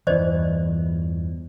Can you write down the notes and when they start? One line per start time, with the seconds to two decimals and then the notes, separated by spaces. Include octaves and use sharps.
0.07 E2 G2 E3 C5 D5 D#5